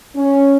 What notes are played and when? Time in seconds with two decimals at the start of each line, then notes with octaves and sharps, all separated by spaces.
0.16 C#4